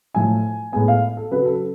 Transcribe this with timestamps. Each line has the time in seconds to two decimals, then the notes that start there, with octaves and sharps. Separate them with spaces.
0.14 A2 F3 A3 G#5
0.72 A2 G#3 B3 G#5
0.88 F5
1.17 A4
1.31 C#3 F#3 C#4 B4
1.46 A4